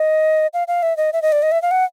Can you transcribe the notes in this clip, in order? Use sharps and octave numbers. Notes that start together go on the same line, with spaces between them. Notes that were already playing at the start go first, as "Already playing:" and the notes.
Already playing: D#5
F5
F5
E5
D#5
E5
D#5
D5
D#5
E5
F5
F#5